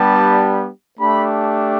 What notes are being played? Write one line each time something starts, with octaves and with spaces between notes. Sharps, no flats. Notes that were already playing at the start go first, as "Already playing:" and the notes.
Already playing: G3 B3 D4 G4 A5
A3 D4 G4 B5